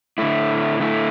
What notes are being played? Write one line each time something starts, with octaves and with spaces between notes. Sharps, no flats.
D3 A3 E4
D3 A3 E4